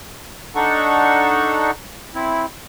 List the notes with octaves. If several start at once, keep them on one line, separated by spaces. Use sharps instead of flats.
D4 D#4 A4 F#5 C#6
C4 E4